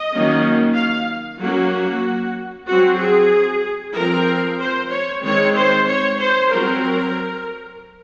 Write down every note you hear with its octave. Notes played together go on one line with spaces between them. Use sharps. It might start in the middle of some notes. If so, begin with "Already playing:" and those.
Already playing: D#5
D#3 F#3 A#3 C#4
F5
F#3 A#3 C#4 F#4
F#3 C4 F#4
G#4
F3 C4 A#4
C5
C#5
D#3 G#3 C4 C#5
C5
C#5
C5
F#3 C4 A#4